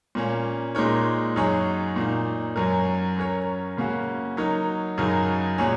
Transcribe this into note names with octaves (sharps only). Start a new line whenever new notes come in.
A#2 A#3 C#4
A#2 G#3 D#4 A#4 C#5
F#2 F#3 D#4 G#4 C#5
A#2 A#3 D#4
F#2 F#3 C#4 A#4
F#3 C#4 A#4 C#5
C#3 A#3 C#4 F#4
F#3 D#4 A#4 C#5
F#2 C#3 F#3 D#4 A#4
A#2 F#3 C#4 G#4